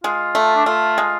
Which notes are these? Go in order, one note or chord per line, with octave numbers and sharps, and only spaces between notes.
G#3 F4
A3
D4
A3 F4
G#3